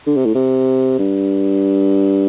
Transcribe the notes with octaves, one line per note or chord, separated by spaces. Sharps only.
D3
C3
A2
C3
G2